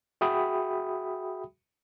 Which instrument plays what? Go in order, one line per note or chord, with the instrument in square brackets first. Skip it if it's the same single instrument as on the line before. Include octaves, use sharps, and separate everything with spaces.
[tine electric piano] F#4 G#4 E5 G5 B5 D#6